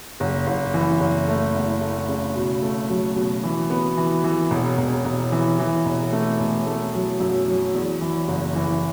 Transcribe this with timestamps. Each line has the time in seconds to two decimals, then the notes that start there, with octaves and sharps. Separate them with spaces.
0.20 F#1
0.47 F#1
0.74 E3
1.00 F#1
1.28 A3
1.54 E2
1.81 A3
2.08 C#3
2.36 B2
2.62 A3
2.90 F#3
3.16 B2
3.43 E3
3.70 B3
3.97 E3
4.24 E3
4.51 E1
4.77 E1
5.05 E1
5.32 E3
5.59 E3
5.85 E1
6.13 A3
6.40 E1
6.66 A3
6.94 F#3
7.20 F#2
7.48 F#3
7.74 E2
8.01 E3
8.28 F#1
8.55 E3